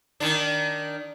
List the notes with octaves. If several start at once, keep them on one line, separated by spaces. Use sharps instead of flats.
D#3 D4